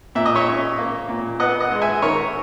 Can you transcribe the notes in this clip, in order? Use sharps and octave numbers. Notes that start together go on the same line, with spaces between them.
A#2 E5
D#5
C#5 E5
C#4
A#3
A#2
B3 D#5 F#5
D#5 F#5
G#3
E5 G#5
D#3 A#4 C#5